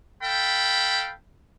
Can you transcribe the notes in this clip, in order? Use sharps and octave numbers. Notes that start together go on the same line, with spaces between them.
A4 F5 G5 B5